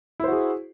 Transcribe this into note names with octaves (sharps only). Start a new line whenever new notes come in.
E4 F#4 G#4 C5